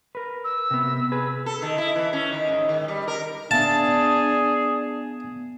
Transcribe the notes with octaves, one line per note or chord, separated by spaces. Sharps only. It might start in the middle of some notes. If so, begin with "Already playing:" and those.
A#4 B4
E6
C3 B3
G#4 B4
A4
D#3
E4
E3
C#4
D#3
G#2
D#3
G3
A#4
B3 D4 G#4 E5 F5 A5